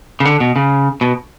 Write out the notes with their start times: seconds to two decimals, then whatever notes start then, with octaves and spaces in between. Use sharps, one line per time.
0.20 C#3
0.25 D3
0.40 B2
0.56 C#3
1.01 B2